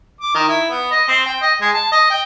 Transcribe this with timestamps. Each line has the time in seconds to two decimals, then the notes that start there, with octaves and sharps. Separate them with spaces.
0.21 D6
0.34 D#3
0.48 E4
0.70 B3
0.91 D#5
1.08 C4
1.26 G5
1.42 D#5
1.61 G#3
1.73 A5
1.92 D#5
2.10 G5